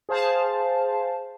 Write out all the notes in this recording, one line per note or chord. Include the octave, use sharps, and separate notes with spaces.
G#4 C5 F5 A5